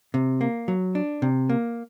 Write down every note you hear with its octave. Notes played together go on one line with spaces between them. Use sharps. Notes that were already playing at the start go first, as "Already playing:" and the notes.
C3
A#3
F#3
D4
C3
A#3